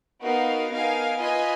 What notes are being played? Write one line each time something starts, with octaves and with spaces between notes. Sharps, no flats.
B3 D#4 F#4 A#4 F5
B3 D#4 A#4 F5 G#5
F4 B4 D#5 G#5